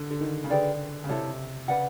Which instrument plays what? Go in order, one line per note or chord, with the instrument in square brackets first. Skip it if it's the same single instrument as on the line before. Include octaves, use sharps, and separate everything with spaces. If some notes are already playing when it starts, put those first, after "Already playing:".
Already playing: [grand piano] D3
D3
D#3
C#3
[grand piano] D3 [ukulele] G#4 B4 D5 G5
[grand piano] C#3
[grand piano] C3 [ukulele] E4 A4 C#5
[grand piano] C#3 [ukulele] B4 D5 F#5